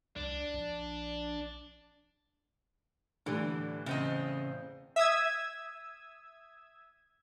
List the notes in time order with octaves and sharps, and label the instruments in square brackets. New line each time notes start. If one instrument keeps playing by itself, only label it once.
[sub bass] C2 [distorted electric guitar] D4
[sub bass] A#1
[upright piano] A2 G3 [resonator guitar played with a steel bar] D3 E3
[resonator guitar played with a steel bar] E2 C4 D#5 [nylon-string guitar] C#3
[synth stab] E5 D#6 E6 G#6